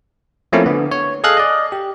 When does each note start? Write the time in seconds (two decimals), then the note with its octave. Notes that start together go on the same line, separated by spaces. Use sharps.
0.52 F3 A3 A#3 C4 C#4 E4
0.66 D3 B3
0.91 C#5
1.24 G#4 A4 D#5 F5 F#6
1.37 D5 D#5
1.72 G4